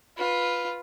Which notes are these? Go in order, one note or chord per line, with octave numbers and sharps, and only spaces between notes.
F4 B4